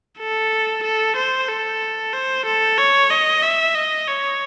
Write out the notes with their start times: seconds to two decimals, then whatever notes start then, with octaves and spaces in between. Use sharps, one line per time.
0.19 A4
0.83 A4
1.16 C5
1.48 A4
2.13 C5
2.46 A4
2.78 C#5
3.10 D#5
3.42 E5
3.75 D#5
4.07 C#5